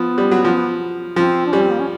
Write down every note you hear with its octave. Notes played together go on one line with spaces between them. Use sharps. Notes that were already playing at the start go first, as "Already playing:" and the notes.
Already playing: F3 B3
G3
F#3
F3
F3 C4
D4
G3 C#4
C4
A#3
C#4